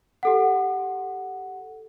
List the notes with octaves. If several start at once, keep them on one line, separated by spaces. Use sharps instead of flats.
G4 A4 F#5